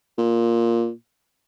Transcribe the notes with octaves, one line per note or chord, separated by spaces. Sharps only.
A#2